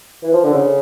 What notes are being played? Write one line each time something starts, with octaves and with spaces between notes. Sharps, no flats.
E3
F3
D3
C#3